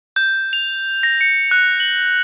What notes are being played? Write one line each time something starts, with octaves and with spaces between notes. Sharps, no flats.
G6
F7
A#6
C#7
F#6
F#7